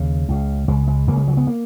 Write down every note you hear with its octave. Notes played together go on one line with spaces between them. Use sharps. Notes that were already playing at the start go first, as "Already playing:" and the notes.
Already playing: D#2 C#3
C#2 C#3
C#2 C#3 G#3
G#3
C#2 C#3 A#3
G#3
F#3
B3
A#3